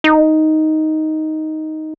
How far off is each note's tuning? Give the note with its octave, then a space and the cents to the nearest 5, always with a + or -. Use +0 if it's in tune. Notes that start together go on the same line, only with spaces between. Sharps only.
D#4 +5